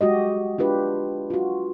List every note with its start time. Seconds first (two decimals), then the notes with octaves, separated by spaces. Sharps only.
0.01 G#3 F#4 G4 D#5
0.58 D4 F4 G4 B4
1.30 F4 F#4